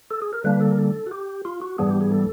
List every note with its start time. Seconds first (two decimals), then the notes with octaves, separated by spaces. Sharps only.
0.10 A4
0.22 G#4
0.33 A#4
0.44 D3 G3 A#3 D4 B4
0.60 A4
0.71 A#4
0.78 A4
1.07 F#4
1.11 G4
1.45 F4
1.62 F#4
1.78 G#2 E3 G3 B3 D4 G#4
1.89 G4
2.01 G#4
2.12 A4